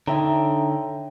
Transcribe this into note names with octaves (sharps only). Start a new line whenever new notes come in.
D3 D4 D#4 C#5 E5 G5 A#5